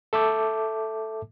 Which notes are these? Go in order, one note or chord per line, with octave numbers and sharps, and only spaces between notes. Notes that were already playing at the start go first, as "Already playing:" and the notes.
A4 E5 A5 D6 G6